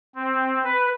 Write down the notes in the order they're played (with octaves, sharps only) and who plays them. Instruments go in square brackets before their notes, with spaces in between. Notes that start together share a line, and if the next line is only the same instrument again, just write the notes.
[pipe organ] C4
B4